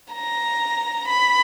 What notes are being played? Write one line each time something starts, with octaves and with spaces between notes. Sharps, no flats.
A#5
B5